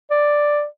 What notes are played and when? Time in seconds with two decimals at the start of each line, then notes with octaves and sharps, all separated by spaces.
0.11 D5